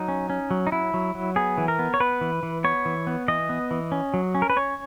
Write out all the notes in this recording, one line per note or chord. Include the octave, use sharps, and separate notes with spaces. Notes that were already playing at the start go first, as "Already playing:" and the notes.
Already playing: F#3 D#4
C#4
C#4
F#3
D#4
F#3 E4
F#3
F#3
B3 G#4
E3
A#4
B3
C#5
B3 B4
E3
E3
B3 C#5
E3
B3
E3 D#5
B3
E3
C#4
F#3
C#4
A#4
B4
C#4 C#5